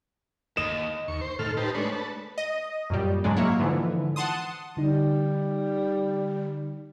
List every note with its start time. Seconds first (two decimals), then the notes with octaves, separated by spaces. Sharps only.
0.57 D#2 D#5 E7
1.08 D#2 C#6
1.21 C5
1.39 A2 D#3 A4 F6
1.57 D#4 G4 B4 C5 A5
1.75 G#3 A3 D4 B4 C#5
1.92 B4 A5
2.38 D#5
2.90 F#2 A#2 G3
3.24 G#2 C#3 F#3 G#3 D4
3.37 F#3 A#3 E4 C#5
3.59 G#2 D3 E3 F3
4.16 F#5 A5 C6 D#6
4.77 D3 G3 D#4